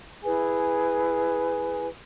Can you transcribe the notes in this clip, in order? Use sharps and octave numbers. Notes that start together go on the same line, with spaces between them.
E4 G#4 B4 G#5